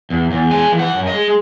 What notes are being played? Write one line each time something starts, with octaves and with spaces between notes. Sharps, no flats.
E2
E2
G#3 G#5
E3
F#5
F#2
D#5
G#3